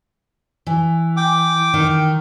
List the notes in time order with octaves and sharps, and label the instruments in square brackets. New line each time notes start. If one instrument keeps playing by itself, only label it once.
[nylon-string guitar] E3
[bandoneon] G5 D6
[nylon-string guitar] D#3